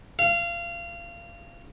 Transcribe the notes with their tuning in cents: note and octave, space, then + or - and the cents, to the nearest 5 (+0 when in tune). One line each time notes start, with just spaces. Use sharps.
F5 -25